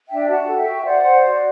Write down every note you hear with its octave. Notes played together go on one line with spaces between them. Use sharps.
D4 E5 G5
F#4 F#5 A5
A4
E5 G5
F#4
C5 D5 F#5
C5
D5
F#4